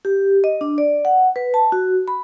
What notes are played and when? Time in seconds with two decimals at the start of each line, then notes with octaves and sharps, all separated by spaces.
0.05 G4
0.44 D#5
0.61 D4
0.78 D5
1.05 F#5
1.36 B4
1.54 A5
1.72 F#4
2.08 B5